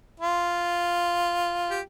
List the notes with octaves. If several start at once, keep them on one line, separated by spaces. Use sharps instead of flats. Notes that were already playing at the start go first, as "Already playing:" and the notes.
F4
G4